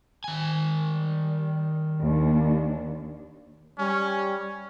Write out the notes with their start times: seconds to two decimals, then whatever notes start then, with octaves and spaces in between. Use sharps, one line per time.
0.24 D#3 G#5
0.85 G3
1.98 D#2 D4
3.79 G3 C#4